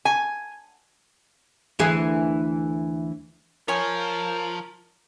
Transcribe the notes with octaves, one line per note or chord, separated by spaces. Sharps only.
G#5
D2 E3 G#4
F3 A#4 C#5 G#5